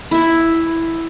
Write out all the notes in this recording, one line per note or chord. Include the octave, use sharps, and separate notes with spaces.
E4 E5